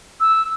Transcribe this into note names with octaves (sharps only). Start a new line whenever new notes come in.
E6